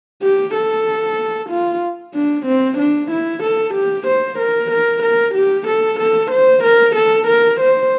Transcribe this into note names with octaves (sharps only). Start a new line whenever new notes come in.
G4
A4
F4
D4
C4
D4
E4
A4
G4
C5
A#4
A#4
A#4
G4
A4
A4
C5
A#4
A4
A#4
C5